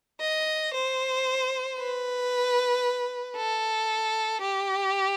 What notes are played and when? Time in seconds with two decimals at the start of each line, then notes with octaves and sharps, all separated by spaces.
0.21 D#5
0.74 C5
1.78 B4
3.36 A4
4.42 G4